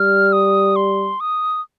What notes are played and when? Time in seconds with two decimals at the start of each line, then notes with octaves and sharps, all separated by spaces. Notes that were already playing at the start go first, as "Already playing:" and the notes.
Already playing: G3 F6
0.33 D#6
0.76 C6
1.20 D#6